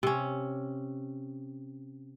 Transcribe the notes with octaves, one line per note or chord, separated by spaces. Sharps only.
C3 C#4